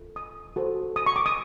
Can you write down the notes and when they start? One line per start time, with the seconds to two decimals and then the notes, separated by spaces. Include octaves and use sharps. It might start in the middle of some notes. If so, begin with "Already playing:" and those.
Already playing: F4 A4
0.16 D#6
0.56 F#4 A4 C5
0.96 D#6
1.06 C#6
1.16 D6
1.26 D#6